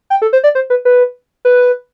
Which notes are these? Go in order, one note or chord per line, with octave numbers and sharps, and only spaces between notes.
G5
A4
C5
D5
C5
B4
B4
B4